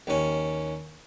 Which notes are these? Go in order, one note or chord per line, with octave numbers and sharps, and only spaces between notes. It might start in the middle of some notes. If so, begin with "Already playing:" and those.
D#2 C#4